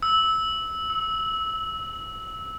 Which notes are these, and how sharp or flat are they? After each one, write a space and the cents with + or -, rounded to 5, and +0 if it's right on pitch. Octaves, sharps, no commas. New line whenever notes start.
E6 -15
E6 -35